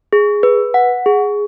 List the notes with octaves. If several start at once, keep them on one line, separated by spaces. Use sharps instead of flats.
G#4
B4
F#5
G#4